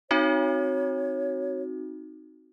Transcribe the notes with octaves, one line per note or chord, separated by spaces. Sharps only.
C4 D#4 F#4 C#5